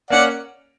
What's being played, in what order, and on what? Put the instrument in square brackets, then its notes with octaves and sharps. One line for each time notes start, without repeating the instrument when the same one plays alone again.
[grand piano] A#3 C#4 [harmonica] D5 F#5